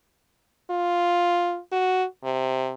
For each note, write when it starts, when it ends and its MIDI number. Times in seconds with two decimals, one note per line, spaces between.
0.71 1.59 65
1.72 2.05 66
2.24 2.74 48